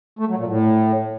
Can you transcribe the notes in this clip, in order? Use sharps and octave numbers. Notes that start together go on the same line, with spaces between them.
A3
F#3
A#2
A2